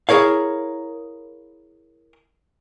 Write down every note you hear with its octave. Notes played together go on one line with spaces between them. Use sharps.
E4 G#4 A#4 C#5 F5